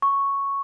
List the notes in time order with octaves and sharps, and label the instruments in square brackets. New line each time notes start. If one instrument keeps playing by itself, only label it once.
[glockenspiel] C#6